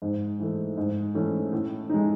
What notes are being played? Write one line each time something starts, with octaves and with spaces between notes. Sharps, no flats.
G#2
E3 A3
G#2
E3 A3 C#4
A2
G#3 D#4